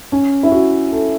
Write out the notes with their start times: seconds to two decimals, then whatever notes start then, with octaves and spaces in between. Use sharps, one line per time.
0.12 C#4
0.43 E4
0.52 F#4
0.92 A4